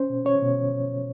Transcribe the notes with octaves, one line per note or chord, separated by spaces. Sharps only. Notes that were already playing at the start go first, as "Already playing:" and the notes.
Already playing: C#4 C5
B2
C#4 C#5
B2